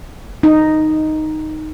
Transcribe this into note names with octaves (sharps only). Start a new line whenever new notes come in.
D#4